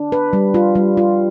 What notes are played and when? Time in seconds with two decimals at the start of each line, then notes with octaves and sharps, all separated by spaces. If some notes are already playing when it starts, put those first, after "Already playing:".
Already playing: D4
0.12 B4
0.33 G3
0.54 F4
0.75 G3
0.97 F4